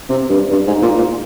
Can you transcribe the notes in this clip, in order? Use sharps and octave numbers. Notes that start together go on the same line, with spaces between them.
C3
G2
G2
G#2
A#2
A#2